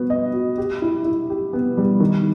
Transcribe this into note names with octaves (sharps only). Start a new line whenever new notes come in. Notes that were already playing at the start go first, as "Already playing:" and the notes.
Already playing: B3 F#4
D#5
F#4
G4
E4
E4
G4
B3
G3
D#3